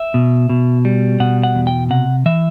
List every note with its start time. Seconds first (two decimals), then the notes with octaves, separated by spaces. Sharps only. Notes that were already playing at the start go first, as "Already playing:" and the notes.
Already playing: E5
0.14 B2
0.49 B2
0.85 G3
1.20 B2 F#5
1.43 F#5
1.55 E2
1.67 G5
1.90 C3 F#5
2.26 E3 E5